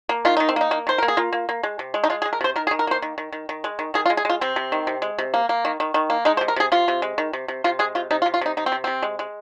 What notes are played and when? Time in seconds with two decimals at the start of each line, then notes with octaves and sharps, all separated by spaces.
0.09 A#3
0.25 D#3 F4
0.37 D#3 D#4
0.49 C4
0.56 A#3 D#4
0.71 A#3
0.87 D#3 C5
0.98 A#3 A#4
1.08 G#4
1.17 A#3 F4
1.33 A#3
1.49 A#3
1.63 G#3
1.79 C3
1.94 G#3
2.04 D#4
2.10 G#3 F4
2.22 G#4
2.25 G#3
2.33 A#4
2.41 C3 C5
2.56 D#3 A#4
2.67 G#4
2.71 D#3
2.79 A#4
2.87 A#3 C5
3.02 D#3
3.18 D#3
3.32 D#3
3.49 D#3
3.64 G#3
3.79 D#3
3.94 D#3 G#4
4.06 F4
4.10 G#3
4.17 G#4
4.25 G#3 F4
4.41 C3 C4
4.56 C3
4.72 D#3
4.87 C3
5.02 G#3
5.18 C3
5.34 A#3
5.49 A#3
5.65 D#3
5.80 D#3
5.94 D#3
6.10 A#3
6.25 G#3 D#4
6.37 C5
6.41 C3
6.48 A#4
6.56 C3 G#4
6.72 C3 F4
6.88 C3
7.02 G#3
7.18 D#3
7.33 C3
7.48 C3
7.64 C3 F4
7.79 G#3 G#4
7.95 C3 F4
8.11 C3 D#4
8.22 F4
8.26 C3
8.34 F4
8.41 C3 D#4
8.57 C3 D#4
8.66 C4
8.72 C3
8.84 C3 C4
9.02 G#3
9.19 G#3